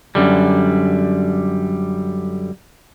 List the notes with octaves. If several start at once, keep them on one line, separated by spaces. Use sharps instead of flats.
F#2 D3 G3